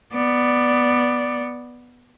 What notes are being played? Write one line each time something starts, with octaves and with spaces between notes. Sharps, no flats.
B3 D5